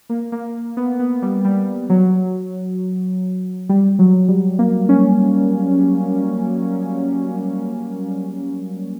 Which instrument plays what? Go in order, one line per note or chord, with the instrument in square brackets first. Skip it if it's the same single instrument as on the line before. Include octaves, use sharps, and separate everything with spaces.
[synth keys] A#3
A#3
B3
B3
G3
G3
F#3
G3
F#3
G3
A#3
C#4